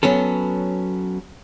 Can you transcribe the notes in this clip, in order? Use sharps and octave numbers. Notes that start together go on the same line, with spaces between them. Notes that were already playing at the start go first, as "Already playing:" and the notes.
F#3 B3 C#4 A4